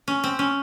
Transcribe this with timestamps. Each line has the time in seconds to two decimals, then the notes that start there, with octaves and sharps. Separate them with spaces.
0.08 C#4
0.24 C4
0.39 C#4